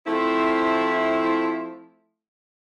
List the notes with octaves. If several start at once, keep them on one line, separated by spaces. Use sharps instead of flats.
F3 A3 C4 E4